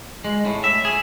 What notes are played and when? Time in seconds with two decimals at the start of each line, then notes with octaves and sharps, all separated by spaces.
0.25 G#3
0.46 A2
0.64 E5
0.85 G#4